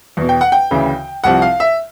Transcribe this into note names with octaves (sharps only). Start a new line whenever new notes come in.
E2 B2
G5
F#5
G5
D2 C#3 E3
C2 C3 F3 F#5
F5
E5